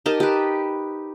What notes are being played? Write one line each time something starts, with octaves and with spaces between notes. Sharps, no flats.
D#4 G4 A#4 A5
G4 B4